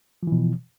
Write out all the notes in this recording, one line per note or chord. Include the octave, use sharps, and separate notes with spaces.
B2 E3 F3